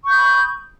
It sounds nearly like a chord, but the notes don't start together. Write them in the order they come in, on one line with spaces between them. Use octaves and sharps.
C#6 G6 D#6 B5